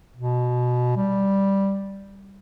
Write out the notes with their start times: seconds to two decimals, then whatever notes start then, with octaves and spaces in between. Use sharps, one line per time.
0.17 B2
0.96 G3